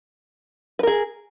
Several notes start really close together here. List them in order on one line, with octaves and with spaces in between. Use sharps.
B4 A#4 G#4